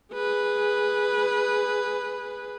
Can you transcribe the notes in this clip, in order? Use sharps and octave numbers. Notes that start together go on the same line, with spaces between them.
G#4 B4